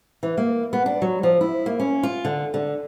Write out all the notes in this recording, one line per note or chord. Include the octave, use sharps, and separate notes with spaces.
E3
A#3
B3
D4
F#3
F3
E4
A#3
C#4
F4
D3
D3